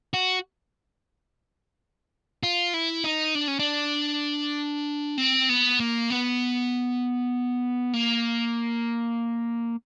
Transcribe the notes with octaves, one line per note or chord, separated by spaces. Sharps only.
F#4
F4
E4
D#4
D4
C#4
D4
C4
B3
A#3
B3
A#3